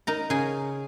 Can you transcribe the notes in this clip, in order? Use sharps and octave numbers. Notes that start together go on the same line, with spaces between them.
D#4 A#4 A#5
C#3 G#4 G#5